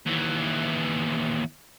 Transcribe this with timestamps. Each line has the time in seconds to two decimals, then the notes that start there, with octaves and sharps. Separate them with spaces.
0.06 D#2 E3